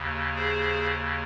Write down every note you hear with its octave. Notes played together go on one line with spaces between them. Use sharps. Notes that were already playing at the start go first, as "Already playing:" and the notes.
Already playing: D#2 C#3
G#4 C5